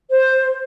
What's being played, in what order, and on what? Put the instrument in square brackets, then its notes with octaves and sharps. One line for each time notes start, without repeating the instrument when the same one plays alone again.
[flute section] C5